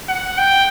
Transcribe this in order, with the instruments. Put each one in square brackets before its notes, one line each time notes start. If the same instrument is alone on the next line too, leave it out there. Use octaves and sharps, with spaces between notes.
[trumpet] F#5
G5